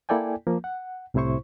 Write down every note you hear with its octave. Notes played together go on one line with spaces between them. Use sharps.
A#3 E4 A4 D5 G5 G#5
F3 A#3
F#5
C2 A2 C3 E4 C5 C#6